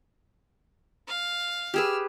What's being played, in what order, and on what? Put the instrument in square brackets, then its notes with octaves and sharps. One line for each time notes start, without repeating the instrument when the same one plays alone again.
[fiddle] F5
[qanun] G4 G#4 B4 [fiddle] E6 F6